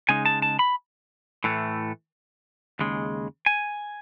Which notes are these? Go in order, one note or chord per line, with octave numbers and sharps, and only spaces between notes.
C#3 G#3 D#4 G#5
A5
A5
B5
A2 E3 A3
D#2 C#3 G#3
G#5